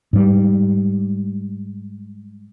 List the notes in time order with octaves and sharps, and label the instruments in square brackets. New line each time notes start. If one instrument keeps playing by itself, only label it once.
[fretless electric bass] G#2 G3